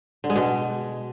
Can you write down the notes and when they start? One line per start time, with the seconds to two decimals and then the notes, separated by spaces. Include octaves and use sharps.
0.24 D3
0.30 G#3
0.36 B2